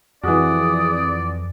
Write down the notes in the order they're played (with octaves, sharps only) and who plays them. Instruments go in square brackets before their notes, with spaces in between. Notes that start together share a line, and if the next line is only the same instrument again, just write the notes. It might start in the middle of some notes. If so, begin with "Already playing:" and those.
[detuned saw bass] F2 [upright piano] E3 F#4 [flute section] G#4 D#6 [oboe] D5